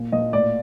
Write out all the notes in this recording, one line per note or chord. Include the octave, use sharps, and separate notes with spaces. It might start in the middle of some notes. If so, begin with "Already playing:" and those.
Already playing: A#2
A#2 D#5
A2 D5